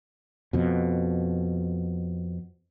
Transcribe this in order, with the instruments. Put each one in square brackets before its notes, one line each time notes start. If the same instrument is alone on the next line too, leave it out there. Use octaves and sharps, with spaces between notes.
[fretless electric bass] F2 B2